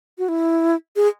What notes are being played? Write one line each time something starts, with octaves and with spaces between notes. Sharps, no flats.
F#4
E4
G#4